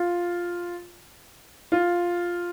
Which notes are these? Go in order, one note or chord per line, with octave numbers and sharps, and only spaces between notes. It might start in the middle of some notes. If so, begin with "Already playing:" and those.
Already playing: F4
F4